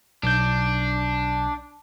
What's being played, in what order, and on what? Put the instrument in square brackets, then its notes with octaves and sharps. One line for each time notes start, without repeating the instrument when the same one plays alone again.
[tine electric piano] B1 G6 [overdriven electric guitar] D4